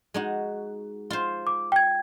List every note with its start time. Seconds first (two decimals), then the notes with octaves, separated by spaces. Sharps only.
0.14 G#3 D#4 F#4
1.10 F4 C5
1.47 D6
1.72 G5 G#6